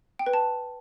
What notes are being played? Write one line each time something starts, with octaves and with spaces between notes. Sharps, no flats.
G5
B4
A5